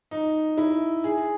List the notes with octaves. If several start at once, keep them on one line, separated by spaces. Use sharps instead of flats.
D#4
E4
G#4